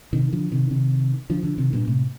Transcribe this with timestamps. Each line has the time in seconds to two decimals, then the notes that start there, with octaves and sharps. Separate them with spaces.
0.13 C3 D#3
0.33 D3 F3
0.52 C3 D#3
0.71 C3 D#3
1.30 D3 F3
1.43 D3 F3
1.58 C3 D#3
1.73 G2 A#2
1.88 A2 C3